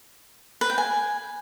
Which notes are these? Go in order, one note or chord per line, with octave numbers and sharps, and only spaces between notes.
B4
G5
G#5